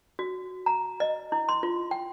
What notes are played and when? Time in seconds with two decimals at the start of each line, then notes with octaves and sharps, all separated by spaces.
0.19 F#4
0.66 A#5
1.00 D#5
1.32 E4
1.49 C6
1.63 F4
1.91 G5